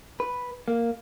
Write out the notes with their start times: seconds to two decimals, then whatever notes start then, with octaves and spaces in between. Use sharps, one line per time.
0.20 B4
0.68 A#3